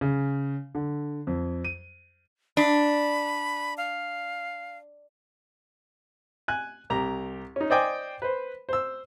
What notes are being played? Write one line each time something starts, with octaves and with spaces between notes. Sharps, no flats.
C#3
D3
F2
D#7
D4 B5
F5
G#5 F#6
C2 G4 A#5
C#4 D#4
C5 D5 D#5 G5 G#5 D6
B4 C5
C5 E6